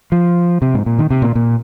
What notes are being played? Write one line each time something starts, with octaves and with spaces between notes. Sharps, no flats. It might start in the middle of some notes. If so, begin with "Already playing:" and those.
F3
C3
G#2
A#2
D#3
C3
A#2
A#2